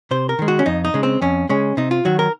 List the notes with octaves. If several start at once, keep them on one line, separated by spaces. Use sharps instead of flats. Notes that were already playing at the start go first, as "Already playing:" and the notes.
C3 C5
A#4
D#3 G#3
F#4
C#4
F2 D#4
D#4
C#3 G#3
C4
F2 C#4
C#3 G#3 C#4
C3 D#4
F4
D#3 F#3 F#4
A#4